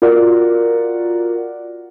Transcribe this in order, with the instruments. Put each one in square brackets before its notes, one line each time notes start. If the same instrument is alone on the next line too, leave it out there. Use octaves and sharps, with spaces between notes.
[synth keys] F4 F#4 A#4 D5 F#5